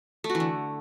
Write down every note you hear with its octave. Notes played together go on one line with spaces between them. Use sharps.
A3
F#4
E3
D3